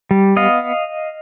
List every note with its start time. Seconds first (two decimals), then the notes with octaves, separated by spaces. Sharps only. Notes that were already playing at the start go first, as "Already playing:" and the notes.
0.11 G3
0.36 B3 D#5 F5